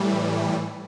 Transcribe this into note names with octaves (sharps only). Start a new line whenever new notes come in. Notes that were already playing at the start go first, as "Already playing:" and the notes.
Already playing: A2 E3 G3